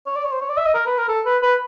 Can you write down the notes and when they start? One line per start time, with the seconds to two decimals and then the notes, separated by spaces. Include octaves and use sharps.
0.06 C#5
0.16 D5
0.24 C#5
0.32 C5
0.41 C#5
0.49 D5
0.57 E5
0.66 D#5
0.74 A#4
0.86 B4
0.98 A#4
1.09 A4
1.26 B4
1.43 B4